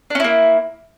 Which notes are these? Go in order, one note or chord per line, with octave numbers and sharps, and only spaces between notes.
A#3 C#4 D4 E4